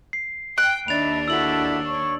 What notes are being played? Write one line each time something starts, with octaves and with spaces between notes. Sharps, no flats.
C7
G5 F#6 D7
D#2 D4 D#5 E5 B5 A6 F7
E4 F#4 A4 E6 F#7
C#5 C#6